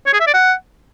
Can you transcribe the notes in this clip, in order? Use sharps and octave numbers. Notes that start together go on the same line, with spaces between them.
C#5
G#4
E5
D5
F#5